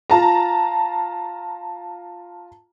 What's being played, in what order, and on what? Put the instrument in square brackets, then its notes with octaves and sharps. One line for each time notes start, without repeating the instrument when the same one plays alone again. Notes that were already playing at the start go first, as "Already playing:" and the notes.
[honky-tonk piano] F4 A5 A#5